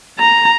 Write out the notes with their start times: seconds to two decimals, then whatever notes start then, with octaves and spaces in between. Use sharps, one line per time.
0.19 A#5